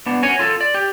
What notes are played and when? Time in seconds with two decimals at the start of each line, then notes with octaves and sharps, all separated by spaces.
0.06 B3 D4
0.23 C#4 F#4 C#5 G#5
0.39 F4 A4
0.61 D5
0.74 G4